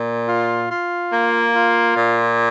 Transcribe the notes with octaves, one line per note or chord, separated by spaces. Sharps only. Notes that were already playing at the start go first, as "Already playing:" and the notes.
Already playing: A#2
F4
F4
A#3
F4
A#2